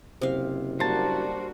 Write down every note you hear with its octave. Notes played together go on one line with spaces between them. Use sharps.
F#1 C3 F5
G3 A#3 D4 F#4 C5 A5